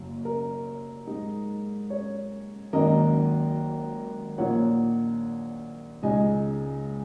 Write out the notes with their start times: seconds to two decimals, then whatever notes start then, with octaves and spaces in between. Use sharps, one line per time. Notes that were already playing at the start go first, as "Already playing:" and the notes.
Already playing: F#1 F#2 F#3 A#3
0.25 A#4
1.07 G#2 G#3 D#4
1.90 C#5
2.73 G#1 F#2 D#3 A#3 A#4 D#5
4.38 A#1 A#2 A#3 D#4 C#5 F#5
6.02 C#2 C#3 G#3 D#4 D#5 G#5